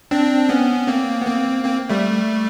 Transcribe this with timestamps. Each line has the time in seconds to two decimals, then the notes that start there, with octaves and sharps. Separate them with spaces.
0.11 C4 D4
0.49 B3 C#4
0.87 A#3 C4
1.21 B3
1.26 A#3 C4
1.64 A#3 C4
1.89 G3 A3